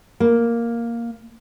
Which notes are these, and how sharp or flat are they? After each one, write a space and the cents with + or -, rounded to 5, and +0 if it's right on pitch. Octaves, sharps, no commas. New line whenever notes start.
A#3 +0